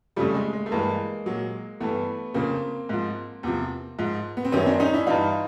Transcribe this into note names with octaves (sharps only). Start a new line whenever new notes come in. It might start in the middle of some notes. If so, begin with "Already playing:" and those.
F2 C#3 F3 G3 A3
G#3
G#3
A3
G2 E3 G#3 A#3
A#2 F#3
G2 E3 A3 B3
F2 C#3 F3 A#3 C4
G#2 F3
E2 C3 F3
G#2 F3
B3
C4
F#2 D#3 F#3 B3 C#4
C4 D4
C#4 D#4
D4 E4
G2 E3 D#4 F4